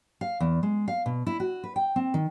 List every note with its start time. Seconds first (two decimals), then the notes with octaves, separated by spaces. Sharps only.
0.21 F5
0.40 E2
0.63 G#3
0.88 F5
1.06 B2
1.27 E4
1.40 F#4
1.64 B4
1.76 G5
1.96 C4
2.14 D#3